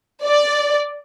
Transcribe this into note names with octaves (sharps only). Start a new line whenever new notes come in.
D5